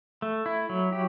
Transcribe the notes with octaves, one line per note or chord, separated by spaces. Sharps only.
A3
E4
F#3
G4